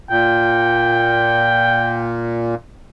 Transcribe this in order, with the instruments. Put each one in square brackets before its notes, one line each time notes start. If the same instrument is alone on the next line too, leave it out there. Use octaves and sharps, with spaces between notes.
[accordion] A#2 [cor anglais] G5